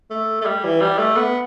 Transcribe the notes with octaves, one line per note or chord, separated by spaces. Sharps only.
A3
A3
G3
E3
G3
A3
B3